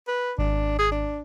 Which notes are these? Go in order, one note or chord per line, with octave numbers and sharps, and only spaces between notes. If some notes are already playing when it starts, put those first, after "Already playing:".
B4
G#1 D4
G#4
D4